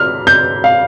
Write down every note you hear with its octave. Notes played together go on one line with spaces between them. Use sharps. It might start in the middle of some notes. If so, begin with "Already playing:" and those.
Already playing: F6
G6
F5